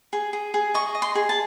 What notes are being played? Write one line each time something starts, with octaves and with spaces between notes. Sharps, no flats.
G#4
G#4
G#4
D#5 C#6
D#5
C6
G#4
A5